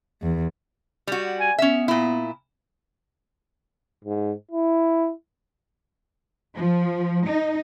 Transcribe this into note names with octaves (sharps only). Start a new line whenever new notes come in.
E2
G3 F#4
G#5
B3 C#4 E5
A#2 E4
G#2
E4
F3
D#4